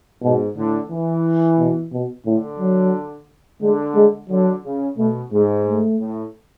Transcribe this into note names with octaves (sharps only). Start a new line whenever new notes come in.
G#2 B2
A2 D3
E3
B2
B2
A2 D3
F#3
D3 G#3
G#3
D3 F#3
C#3
B2 A3
G#2 G#3
A3
A2